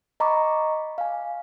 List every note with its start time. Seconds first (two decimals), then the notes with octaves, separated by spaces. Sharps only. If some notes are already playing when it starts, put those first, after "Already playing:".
0.20 D#5 A#5 B5 C#6 D6
0.98 F5 G#5